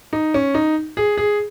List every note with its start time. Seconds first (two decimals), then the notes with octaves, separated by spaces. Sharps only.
0.13 D#4
0.34 C#4
0.54 D#4
0.97 G#4
1.18 G#4